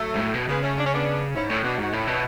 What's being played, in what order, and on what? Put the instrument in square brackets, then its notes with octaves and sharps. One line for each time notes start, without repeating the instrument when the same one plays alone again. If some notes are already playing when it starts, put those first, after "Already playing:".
Already playing: [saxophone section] F#3 A3
[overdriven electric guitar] G#2
A2
B2
[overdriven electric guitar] C#3 [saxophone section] G#3 B3
[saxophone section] A3 C#4
D4
C#4
B3 D4
[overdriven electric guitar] G#2 [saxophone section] C#4 E4
[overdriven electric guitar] A2 [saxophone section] C#4 E4
[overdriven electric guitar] B2 [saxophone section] D4 F#4
[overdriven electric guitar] G#2 [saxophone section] F#4
[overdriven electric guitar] A2 [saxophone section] C#4 E4
[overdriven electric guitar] B2